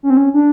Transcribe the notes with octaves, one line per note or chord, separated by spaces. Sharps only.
C#4
C4
C#4
D4